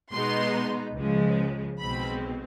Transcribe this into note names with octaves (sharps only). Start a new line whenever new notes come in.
B2 G#3 B3 D#4 C6
C#2 C#3 F3 G#3
B1 B2 G#3 C4 B5